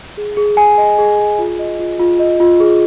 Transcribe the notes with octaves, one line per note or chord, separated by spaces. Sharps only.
G#4
G#4
G#5
D#5
G#4
G#4
F4
D#5
F4
F4
D#5
F4
G#4